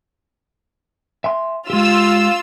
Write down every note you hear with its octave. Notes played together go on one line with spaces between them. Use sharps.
E5 G#5 C6
G#3 F4 G4 E6